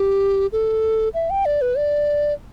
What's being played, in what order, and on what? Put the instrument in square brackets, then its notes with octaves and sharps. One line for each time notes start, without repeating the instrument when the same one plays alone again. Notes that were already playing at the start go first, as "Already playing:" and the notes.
Already playing: [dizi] G4
A4
E5
G5
D5
B4
D5